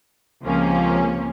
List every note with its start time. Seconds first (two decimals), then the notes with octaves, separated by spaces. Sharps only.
0.42 C#2 C3 F3 A#3 C#4